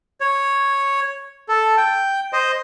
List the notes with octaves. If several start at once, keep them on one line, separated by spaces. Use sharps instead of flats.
C#5
A4
G5
C5 D#5